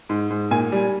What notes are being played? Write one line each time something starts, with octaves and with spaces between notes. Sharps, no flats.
G#2
G#2
A#2 G#5
G3